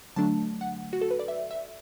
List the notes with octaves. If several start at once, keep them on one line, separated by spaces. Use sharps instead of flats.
D3 F#3 A3 D4 A5
F#5
F#4
A4
B4
D5
E5
E5